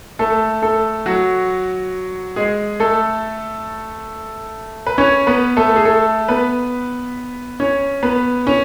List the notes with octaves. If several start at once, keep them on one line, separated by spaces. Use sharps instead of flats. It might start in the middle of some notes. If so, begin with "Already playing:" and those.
A3 A4
A3 A4
F#3 F#4
G#3 G#4
A3 A4
B4
C#4 C#5
B3 B4
A3 A4
G#4
A3 A4
B3 B4
C#4 C#5
B3 B4
C#4 C#5